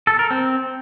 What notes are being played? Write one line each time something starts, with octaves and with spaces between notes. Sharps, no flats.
A4
A#4
C4